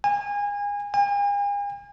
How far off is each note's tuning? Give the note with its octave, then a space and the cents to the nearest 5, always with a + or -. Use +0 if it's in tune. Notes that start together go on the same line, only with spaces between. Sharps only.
G#5 -30
G#5 -45